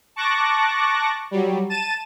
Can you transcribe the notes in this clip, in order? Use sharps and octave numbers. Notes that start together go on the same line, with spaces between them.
A5 C#6 D6 F#6 A#6
F#3 G3
A5 A6 D#7 E7